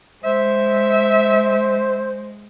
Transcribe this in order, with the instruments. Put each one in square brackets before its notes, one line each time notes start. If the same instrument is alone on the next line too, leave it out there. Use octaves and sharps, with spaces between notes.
[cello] G#3 [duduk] C5 [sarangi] E5